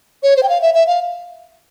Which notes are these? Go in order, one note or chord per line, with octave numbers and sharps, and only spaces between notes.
C#5
C5
G5
F5
E5
E5
F5